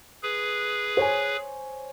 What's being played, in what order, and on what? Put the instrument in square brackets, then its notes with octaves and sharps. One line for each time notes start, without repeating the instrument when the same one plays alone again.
[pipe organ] G#4 B4
[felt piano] C5 C#5 G#5